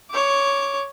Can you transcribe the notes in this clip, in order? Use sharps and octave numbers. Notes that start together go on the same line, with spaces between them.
C#5 D6